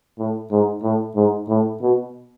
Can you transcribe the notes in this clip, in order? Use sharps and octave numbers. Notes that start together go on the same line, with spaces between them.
A2
G#2
A2
G#2
A2
B2